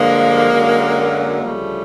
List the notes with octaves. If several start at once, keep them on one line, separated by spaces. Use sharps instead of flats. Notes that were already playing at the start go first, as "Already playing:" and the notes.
Already playing: G2 D3 F3 G#3 A#3
F#2 D3 F#3
D2 C#3 F3 G3 A3